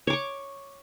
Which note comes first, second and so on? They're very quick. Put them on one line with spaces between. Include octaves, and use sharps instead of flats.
C#5 D6 C#6